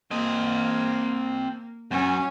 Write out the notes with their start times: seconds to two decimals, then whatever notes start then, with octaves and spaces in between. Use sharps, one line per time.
0.11 A#3 C4 D#5
1.91 F#2 C#4